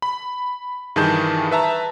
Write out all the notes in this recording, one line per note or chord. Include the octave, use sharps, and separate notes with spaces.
B5
G2 D#3 E3 G#4 A5 G6
B4 E5 A5 A#5